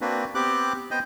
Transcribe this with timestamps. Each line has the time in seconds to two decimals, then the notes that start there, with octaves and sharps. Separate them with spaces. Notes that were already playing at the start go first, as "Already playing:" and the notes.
0.01 A#3 C4 D4 F#4 B4
0.35 B3 C4 G4 D6 F#6
0.91 B3 C5 D#5 G5